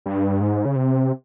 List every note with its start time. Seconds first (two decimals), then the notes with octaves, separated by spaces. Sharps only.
0.06 G2
0.41 G#2
0.65 C#3
0.76 C3